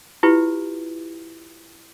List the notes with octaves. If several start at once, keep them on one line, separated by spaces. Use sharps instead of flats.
E4 F4 G4 B4